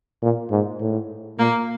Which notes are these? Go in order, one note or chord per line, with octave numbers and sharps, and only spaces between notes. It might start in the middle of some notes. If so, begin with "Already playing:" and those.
A#2
G#2
A2
A#2 A#3